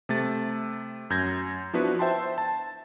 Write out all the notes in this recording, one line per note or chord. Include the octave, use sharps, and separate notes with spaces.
C3 A3 A6
F#2 G6 G#6 A#6
F3 B3 D4 E4 F#4 B4
C5 E5 G5 A5 C6
A5